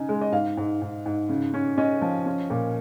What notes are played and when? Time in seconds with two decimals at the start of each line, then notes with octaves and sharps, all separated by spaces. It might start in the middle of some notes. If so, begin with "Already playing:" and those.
Already playing: C#3 D#4 G#5
0.09 G#3
0.21 D#5
0.32 G#2 F5
0.57 G#2
0.82 G#2
1.06 G#2
1.29 C#3
1.54 C#4
1.78 C#4 D#5
2.02 F3
2.26 C#4
2.50 A#2